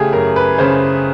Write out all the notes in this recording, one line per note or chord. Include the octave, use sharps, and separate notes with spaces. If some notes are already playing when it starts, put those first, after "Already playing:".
Already playing: C#3 A3 G4 G#4
F#2 A#4
B4
C#3 C5